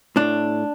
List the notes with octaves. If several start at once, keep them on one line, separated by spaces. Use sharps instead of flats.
A2 D4